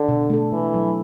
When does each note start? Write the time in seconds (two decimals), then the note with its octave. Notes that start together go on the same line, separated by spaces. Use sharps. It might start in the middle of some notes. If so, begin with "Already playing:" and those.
Already playing: D3
0.08 B2
0.30 A3 D4 A4
0.52 B2 E3
0.74 F#3 A3